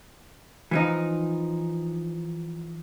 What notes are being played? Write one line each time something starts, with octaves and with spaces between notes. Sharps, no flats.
E3 F3 D#4